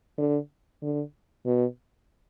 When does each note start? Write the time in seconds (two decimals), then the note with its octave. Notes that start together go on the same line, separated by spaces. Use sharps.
0.18 D3
0.82 D3
1.46 B2